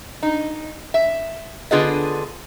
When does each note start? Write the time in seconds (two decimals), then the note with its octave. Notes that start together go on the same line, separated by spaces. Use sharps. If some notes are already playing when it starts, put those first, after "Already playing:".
0.23 D#4
0.94 E5
1.71 D3 B3 F4 G#4 B4 D#5